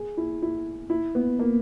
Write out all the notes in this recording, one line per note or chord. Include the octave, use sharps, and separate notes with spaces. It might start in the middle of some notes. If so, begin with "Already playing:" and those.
Already playing: G#4
E4
E4
E4
B3
A#3